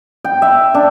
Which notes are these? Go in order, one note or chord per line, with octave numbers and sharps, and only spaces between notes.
G5
E5
D4